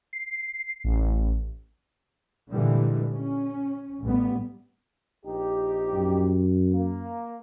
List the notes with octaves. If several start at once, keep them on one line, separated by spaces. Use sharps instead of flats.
C7
A1
A#2 D3 E3 G3 G#3
C#4
A1 G3 B3
A#1 D#4 G4
F#2
A#3